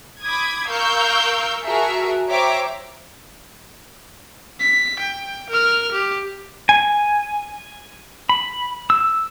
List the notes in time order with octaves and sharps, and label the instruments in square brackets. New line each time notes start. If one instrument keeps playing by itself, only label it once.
[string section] B5 D6 D#6 G#6
A#4 F5 C#6 E6 G6
F#4 G#4 A#4 E5 A5
C5 C#5 E5 G5 A#5 D6
[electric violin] B6
G5
A#4 F6
G4
[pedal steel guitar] G#5
B5
E6